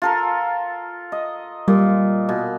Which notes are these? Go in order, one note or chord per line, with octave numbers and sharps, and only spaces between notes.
F4 A4 A#4
D#5
A#2 G3
B2